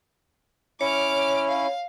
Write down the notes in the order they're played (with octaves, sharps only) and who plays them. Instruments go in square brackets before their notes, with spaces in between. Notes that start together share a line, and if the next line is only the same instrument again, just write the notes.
[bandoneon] C#4 E4 [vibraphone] C#5 [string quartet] D6 F6
[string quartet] F5